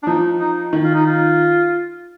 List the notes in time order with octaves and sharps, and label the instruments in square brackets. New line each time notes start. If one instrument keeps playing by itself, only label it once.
[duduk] D4
[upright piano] F3 [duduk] D#4
[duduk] D#4
[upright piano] D#3
[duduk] F4
D#4
F4